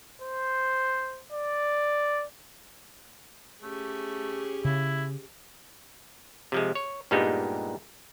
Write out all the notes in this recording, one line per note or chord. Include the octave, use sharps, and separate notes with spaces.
C5
D5
A3 C#4 G4 G#4
C#3 E4
C3 F3 G#3
C#5
G2 A#2 G3 G#3 B3 D#4